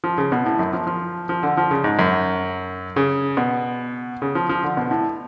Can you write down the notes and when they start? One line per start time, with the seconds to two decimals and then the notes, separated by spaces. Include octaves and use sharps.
0.04 F3
0.18 C#3
0.32 B2
0.45 A2
0.59 F#2
0.73 F3
0.87 F3
1.29 F3
1.43 D3
1.57 F3
1.71 C#3
1.84 G#2
1.99 F#2
2.96 C#3
3.37 B2
4.22 C#3
4.35 F3
4.49 F3
4.63 D3
4.77 B2
4.91 A2